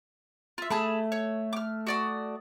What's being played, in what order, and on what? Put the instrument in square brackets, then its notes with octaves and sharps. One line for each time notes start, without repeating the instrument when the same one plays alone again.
[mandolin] F4 E5
[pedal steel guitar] A3 [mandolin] G#4 A5 B5
[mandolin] C#5
D6 F6
F#4 D5 D#6